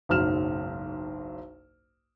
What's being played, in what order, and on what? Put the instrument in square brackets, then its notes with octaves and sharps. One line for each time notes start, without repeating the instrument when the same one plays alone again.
[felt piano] F#1 B1 G#2 F#3 F6 E7